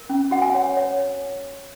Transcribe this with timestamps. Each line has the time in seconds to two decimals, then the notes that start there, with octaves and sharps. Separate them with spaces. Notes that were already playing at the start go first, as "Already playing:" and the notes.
Already playing: A#4
0.09 C#4
0.31 F#4 F#5
0.42 G#5
0.50 C#5 F#5
0.77 C#5